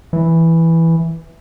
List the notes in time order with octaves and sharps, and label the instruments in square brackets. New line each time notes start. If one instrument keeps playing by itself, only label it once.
[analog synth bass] E3